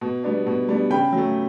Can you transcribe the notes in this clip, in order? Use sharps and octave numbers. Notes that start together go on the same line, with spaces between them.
B2
G3 B3 D4
B2
G3 B3 D4
C#3 G5 B5
F#3 A3